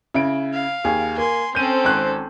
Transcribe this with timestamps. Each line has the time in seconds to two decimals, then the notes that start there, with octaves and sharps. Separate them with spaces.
0.14 C#3 E4 D7
0.53 F5
0.84 D#2 G#4
1.18 A#3 G#5 C6
1.55 C4 C#4 A4 G6 D#7
1.85 G#1 F#6